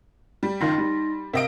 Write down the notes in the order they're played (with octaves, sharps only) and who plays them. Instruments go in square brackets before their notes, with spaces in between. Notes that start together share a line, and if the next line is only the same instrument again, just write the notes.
[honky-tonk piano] G3
[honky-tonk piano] F#1 D#3 F4 [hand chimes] D#4 C6 A#6
[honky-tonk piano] G3
[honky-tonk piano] C3 D#5 D7 [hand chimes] A#4 F5